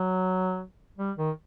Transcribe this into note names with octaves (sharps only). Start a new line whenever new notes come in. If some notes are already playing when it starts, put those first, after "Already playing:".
Already playing: F#3
G3
D#3